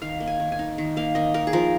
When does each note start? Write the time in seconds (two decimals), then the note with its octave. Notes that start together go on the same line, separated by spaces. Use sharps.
0.02 D#3 F5
0.20 A#3
0.27 G#5
0.40 D#3
0.52 G#5
0.59 D#4
0.78 D#3
0.97 A#3 F5
1.15 D#3 D#5
1.34 D#4 A#4
1.47 G#4
1.53 F3 A#4